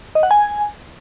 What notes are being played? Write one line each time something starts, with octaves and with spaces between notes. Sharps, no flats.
D#5
F#5
G#5